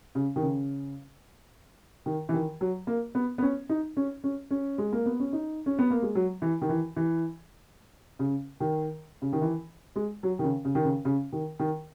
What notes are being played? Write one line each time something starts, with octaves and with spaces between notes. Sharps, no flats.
C#3
D#3
C#3
D#3
E3
D#3
F#3
A#3
B3
B3
C#4
D#4
C#4
C#4
C#4
G#3
A#3
B3
C#4
D#4
C#4
B3
A#3
G#3
F#3
E3
D#3
E3
E3
C#3
D#3
C#3
D#3
E3
G#3
F#3
D#3
C#3
C#3
D#3
C#3
C#3
D#3
D#3